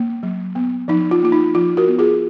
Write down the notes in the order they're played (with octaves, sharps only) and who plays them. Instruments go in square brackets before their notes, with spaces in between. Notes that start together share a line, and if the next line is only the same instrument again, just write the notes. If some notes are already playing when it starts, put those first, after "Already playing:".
Already playing: [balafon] A#3
F#3
B3
F3 D#4
F4
A#3 F4
D#4
F3 F4
F#4 A#4
B3
F4 G#4